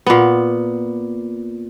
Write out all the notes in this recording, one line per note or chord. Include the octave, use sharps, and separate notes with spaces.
A#2 B3